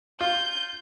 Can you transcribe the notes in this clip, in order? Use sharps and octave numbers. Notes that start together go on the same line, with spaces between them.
F4 G6